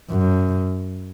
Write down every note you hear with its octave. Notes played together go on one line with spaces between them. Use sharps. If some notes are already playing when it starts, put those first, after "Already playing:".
F#2